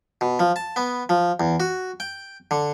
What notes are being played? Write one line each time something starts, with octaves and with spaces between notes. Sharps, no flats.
B2
F3
A5
B3
F3
E2
F#4
G5
D3